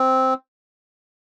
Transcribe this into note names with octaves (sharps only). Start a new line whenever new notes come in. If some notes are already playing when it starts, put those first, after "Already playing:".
Already playing: C4